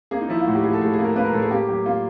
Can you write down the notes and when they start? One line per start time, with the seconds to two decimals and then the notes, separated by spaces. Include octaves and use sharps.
0.11 A#3 G#4
0.21 D#4
0.29 F3 E4
0.38 F4
0.47 A2 F#4
0.55 G4
0.63 F3 G#4
0.73 A4
0.81 A2 G#4
0.93 G#4
0.98 A#3
1.04 A#4
1.16 A#3 B4
1.25 A#4
1.33 A2 A4
1.42 G#4
1.51 A#3 G4
1.68 F#3 G4
1.86 A#3 F4